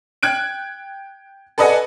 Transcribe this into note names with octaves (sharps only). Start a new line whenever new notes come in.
G5 F#6 G#6 D7
A4 B4 D5 D#5 F#5 G#5